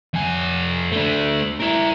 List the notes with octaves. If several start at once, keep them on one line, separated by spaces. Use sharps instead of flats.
F2 G#5
A3 D4
E4 A#4